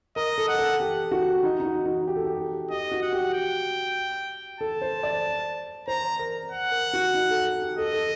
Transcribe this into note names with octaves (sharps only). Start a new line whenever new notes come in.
A#4 D#5
A4
F#5
A4
G4
F#4
D#4
D#4
F#4
D#4
G4
A4
G4
G4 D#5
F#4
F#5
G4
G5
A4 A5
C5
D5
C5 A#5
A#4
F#5
A#4
F#4
D#4
A4
G4
A4 D#5
A4